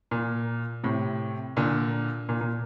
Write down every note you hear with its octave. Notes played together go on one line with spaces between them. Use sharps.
A#2
A2 C3
A#2 D3
A#2
A#2